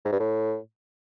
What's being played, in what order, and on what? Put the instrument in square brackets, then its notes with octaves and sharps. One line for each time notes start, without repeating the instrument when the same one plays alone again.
[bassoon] G#2
G2
A2